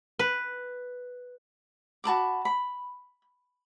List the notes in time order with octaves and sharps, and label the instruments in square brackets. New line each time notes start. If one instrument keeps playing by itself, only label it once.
[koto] B4
[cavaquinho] F#4 A5 B5 D6
B5